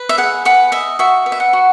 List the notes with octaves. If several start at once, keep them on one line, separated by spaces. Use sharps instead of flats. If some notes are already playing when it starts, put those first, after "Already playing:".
Already playing: B4
E5
G#4 F#5
B4 F#5
D#5 E5
F#4 E5
B4
E5
F#5
F#4